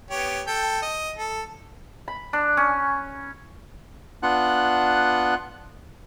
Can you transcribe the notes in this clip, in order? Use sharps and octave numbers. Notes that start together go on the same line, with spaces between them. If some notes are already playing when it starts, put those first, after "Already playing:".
B3 G4 C#5
A4 G5
D#5
A4
B5
D4
C#4
B3 D4 F4 F#5 F#6